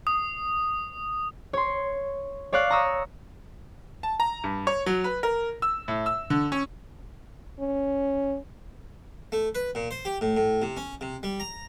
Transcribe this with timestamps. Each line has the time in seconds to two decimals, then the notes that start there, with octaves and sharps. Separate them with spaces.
0.07 D#6
1.53 C#5 C6
2.53 C#5 D5 F5 D6 F#6
2.70 A#5 C#6 D#6 E6
4.03 A5
4.20 A#5
4.44 G2
4.67 C#5
4.86 F#3
5.04 B4
5.23 A#4
5.62 E6
5.88 A2
6.06 E6
6.30 D3
6.52 C#4
7.59 C#4
9.32 A3
9.55 B4
9.75 A#2
9.91 C5
10.05 G4
10.21 A2
10.37 A2
10.62 C3
10.77 C#4
11.01 C3
11.23 G3
11.40 A#5